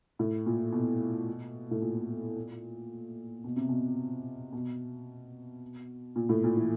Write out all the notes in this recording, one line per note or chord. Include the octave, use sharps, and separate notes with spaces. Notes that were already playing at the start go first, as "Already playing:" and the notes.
A2
A#2
B2
A2
A#2
B2
C3
B2
B2
A#2
A2
A#2
E3